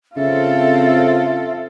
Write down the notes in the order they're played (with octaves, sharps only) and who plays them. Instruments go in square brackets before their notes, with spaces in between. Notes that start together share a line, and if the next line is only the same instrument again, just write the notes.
[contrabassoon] C#3 [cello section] C4 A4 [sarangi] F4 [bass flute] E5